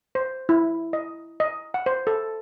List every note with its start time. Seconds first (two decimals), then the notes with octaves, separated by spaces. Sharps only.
0.15 C5
0.49 E4
0.93 D#5
1.40 D#5
1.74 F#5
1.86 C5
2.07 A4